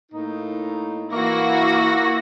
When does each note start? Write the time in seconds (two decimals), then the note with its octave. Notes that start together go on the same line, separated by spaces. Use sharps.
0.11 A2 A#3 D#4
1.12 E3 A#3 E4 F#4 A#6